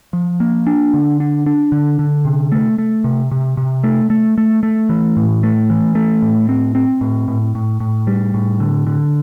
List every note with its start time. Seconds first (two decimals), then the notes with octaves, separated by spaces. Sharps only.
0.13 F3
0.40 A#3
0.67 D4
0.94 D3
1.20 D4
1.46 D4
1.72 D3
1.99 D3
2.25 C3
2.52 A3
2.78 A3
3.04 C3
3.32 C3
3.57 C3
3.84 A3
4.10 A3
4.38 A3
4.63 A3
4.89 E3
5.17 A2
5.43 A3
5.70 E3
5.95 A3
6.22 A2
6.49 C4
6.75 C4
7.01 A2
7.28 A2
7.55 A2
7.80 A2
8.07 G3
8.34 A2
8.60 D3
8.87 D3